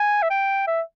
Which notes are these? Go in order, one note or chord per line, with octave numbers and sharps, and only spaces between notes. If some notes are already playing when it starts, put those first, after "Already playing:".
Already playing: G#5
E5
G5
E5